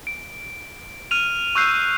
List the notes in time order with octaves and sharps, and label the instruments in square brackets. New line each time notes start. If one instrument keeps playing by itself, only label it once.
[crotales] D7
F6 D#7 F7
C#6 E6 F#6 G6 C7